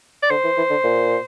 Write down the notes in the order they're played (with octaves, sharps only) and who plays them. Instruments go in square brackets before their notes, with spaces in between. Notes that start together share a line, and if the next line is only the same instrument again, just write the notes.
[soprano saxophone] D5
[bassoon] D3 [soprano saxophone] C5
[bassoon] E3
E3
D3
A#2